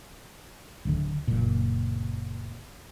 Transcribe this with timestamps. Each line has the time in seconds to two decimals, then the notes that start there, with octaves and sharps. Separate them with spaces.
0.85 D1 D2 D3
1.28 F#1 A#2